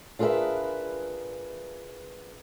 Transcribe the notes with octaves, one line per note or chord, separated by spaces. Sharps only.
D4 F4 G#4 A#4 B4 E5